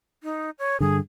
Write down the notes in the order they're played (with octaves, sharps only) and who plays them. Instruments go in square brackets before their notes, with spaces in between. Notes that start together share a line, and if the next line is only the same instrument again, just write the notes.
[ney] D#4
C#5
[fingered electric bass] G2 D3 [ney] G#4